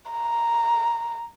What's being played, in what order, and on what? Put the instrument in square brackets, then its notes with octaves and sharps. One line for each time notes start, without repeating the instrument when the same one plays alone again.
[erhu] A#5